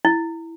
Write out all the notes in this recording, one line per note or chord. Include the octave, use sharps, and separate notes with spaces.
E4